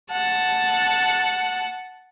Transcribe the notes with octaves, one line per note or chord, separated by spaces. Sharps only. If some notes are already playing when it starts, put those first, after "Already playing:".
F#5 A5